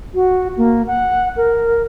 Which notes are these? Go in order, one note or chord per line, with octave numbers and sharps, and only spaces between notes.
F#4
A#3
F#5
A#4